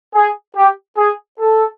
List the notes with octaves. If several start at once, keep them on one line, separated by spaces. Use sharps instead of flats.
G#4
G4
G#4
A4